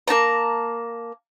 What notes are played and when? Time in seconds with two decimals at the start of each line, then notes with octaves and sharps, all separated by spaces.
0.08 A#3 D#4 A5 A#5